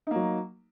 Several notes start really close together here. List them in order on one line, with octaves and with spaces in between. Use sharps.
D#4 A#3 F#3